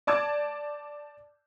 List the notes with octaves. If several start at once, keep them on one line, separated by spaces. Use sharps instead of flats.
D5 A5 D6 G#6